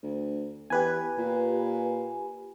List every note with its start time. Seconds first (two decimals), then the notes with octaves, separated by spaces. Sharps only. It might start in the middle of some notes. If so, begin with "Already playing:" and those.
0.03 D2
0.70 E2 G4 B4 G#5
1.18 A#2